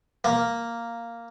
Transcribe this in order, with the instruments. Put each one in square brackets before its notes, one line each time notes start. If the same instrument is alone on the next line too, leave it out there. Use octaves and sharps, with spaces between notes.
[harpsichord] A#3